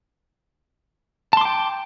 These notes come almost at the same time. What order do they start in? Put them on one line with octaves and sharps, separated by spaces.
A5 C6 D6 G5